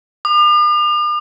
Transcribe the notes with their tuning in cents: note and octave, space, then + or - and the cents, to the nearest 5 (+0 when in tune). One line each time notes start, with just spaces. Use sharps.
D6 +45